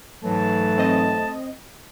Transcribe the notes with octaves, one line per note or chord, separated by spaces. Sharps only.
G#2 E3 F#3 A3 A5
C4 D#5